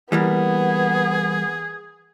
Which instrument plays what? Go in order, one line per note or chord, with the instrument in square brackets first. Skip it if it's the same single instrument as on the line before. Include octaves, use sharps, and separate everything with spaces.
[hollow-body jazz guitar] E3 G3 A#3 [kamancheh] B3 [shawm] G#4